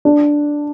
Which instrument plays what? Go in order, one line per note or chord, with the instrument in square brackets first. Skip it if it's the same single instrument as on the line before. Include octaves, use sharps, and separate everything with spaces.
[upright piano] D4